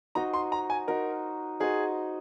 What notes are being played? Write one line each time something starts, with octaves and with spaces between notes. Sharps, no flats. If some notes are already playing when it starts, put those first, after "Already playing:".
D#4 F#4 C5 D#5 A#5
C6
A#5
G#5
D#4 F#4 A#4 C5 D#5
D#4 F#4 G#4 C5 D#5